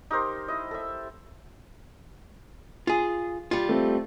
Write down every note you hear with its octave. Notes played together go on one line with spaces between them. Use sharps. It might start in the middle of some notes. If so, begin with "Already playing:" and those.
D#4 G4 A#4 C5
E4 D#5
A4 E5
F4 G#4
G3 F4
A3 C4